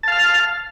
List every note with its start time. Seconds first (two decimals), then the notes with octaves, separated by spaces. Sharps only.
0.03 A5
0.08 F5
0.12 F6